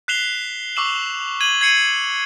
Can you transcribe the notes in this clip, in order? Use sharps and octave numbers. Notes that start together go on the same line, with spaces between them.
F#6 B6 C7 E7 F7 G7
C#6 D6 E6 E7 F#7
G#6 D#7 E7 F#7 G7
G#6 C7 C#7 D#7 F#7